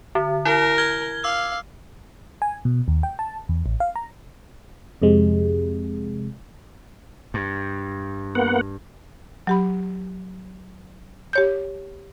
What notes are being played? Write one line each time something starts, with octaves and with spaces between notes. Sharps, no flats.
D3
E4 A#4
F6 G#6 G7
F5 D6 E6
G#5
B2
D#2
G5
A5
E2
A1
F5
A#5
F2 C3 G#3
G2
A#3 B3 F#5
F#3 G4 B5
G4 C#5 G6